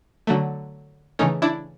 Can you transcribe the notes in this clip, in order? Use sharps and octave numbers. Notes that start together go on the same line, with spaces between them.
D3 F#3 A3
C#3 E3 A3 C#4 D#4
D4 E4